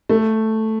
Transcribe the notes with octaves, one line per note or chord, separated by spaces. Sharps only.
A3